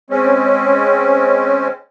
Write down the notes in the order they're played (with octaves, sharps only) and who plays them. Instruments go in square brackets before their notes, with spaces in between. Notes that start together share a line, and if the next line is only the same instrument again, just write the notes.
[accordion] G#3 C4 C#4